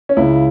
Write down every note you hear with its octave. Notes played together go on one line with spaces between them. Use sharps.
C#4
C#2 C#3 G#3 E4